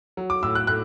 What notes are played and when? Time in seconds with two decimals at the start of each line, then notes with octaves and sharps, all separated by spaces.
0.17 F#3
0.30 D6
0.43 A2 E6
0.55 F#6
0.67 A2 F#6